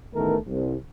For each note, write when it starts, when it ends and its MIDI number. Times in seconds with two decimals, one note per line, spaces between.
0.15 0.36 33
0.15 0.36 51
0.15 0.36 57
0.15 0.36 59
0.15 0.36 70
0.48 0.74 36